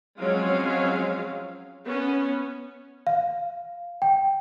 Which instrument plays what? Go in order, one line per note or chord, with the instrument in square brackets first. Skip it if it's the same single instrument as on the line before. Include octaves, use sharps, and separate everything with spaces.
[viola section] F3 F#3 G#3 C4 C#4 F5
B3 C#4
[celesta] F5
G5